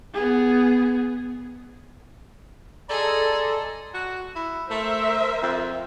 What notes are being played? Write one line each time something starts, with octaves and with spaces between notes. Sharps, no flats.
B3 G#4
G#4 A4 D5 D#5 A#5 C6
F#4
E4
A3 A#4 C5 E5
F2